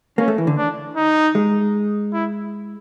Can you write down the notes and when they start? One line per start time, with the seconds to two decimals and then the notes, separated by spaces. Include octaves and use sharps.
0.18 A#3 C#4
0.28 A3
0.38 E3
0.47 D3
0.57 D4
0.96 D#4
1.35 G#3
2.13 E4